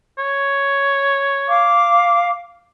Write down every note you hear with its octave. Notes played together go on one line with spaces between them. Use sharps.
C#5
F5 D6